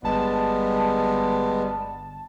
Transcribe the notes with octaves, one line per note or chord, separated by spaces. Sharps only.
G1 G3 G#3 B3 A5